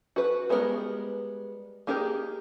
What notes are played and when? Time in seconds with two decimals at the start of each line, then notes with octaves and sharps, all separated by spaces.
0.16 F#4 B4
0.49 G3 G#3 B3 F4 A#4
1.87 A#3 D#4 G4 G#4 A#4